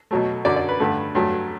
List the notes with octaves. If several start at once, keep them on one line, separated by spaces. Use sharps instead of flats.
B2 F#3 A3
F#2 D3 F#3 D5
D5
B4
G2 D3 A3
G2 F#3 A3